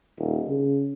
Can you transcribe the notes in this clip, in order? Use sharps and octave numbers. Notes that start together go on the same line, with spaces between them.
D#1
C#3